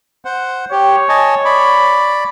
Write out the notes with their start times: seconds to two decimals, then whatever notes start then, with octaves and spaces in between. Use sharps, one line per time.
0.25 C5 F#5
0.72 G4 C#5
1.09 D#5 G#5 A5
1.45 D5 B5